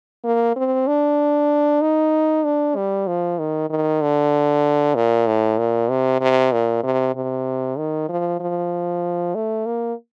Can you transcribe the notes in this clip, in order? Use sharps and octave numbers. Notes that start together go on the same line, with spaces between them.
A#3
C4
D4
D#4
D4
G3
F3
D#3
D#3
D3
A#2
A2
A#2
C3
C3
A#2
C3
C3
D#3
F3
F3
A3
A#3